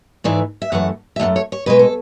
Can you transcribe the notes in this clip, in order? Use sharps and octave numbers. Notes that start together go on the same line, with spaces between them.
G#2 E3 A3 D5
E5
F#2 E3 A3 F#5
E5
F#2 E3 A3 F#5
C#5
C#5
B2 G#3 B4
A4